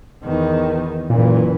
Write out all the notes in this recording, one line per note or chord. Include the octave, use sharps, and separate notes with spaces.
E2 D#3
F#1 A#2 E3